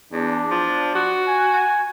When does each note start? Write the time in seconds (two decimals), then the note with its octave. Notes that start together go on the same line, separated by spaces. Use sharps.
0.12 E2 D4
0.51 F3
0.95 F#4
1.28 G#5